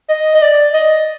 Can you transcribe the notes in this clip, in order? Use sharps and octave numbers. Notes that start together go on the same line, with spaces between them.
D#5
D#5
D5
D#5